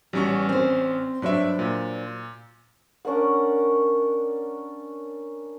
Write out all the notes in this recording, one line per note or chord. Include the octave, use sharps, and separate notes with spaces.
A1 G3 B3 C#4 F#4 C#6
C4 C5
G2 F#3 D4 C5 E5
A#2
C#4 D4 A#4 F#5